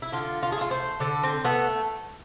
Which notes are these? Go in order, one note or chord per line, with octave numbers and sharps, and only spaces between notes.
E4
D3 F4
F4
G#4
A3 F4
C5
D3 A4
C4
A3 B3